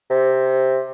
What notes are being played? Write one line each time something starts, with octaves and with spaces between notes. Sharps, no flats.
C3